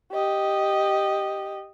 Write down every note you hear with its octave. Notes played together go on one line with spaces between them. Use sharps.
G4 D#5